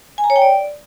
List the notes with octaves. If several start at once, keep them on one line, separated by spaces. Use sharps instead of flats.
G#5
A#5
C#5
G5
D5